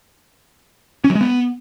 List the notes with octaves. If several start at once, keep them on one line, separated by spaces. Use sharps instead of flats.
C#4
F#3
G#3
B3